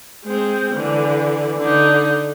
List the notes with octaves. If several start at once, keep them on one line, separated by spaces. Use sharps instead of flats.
G#3 C4
D3 E3
D3 D#4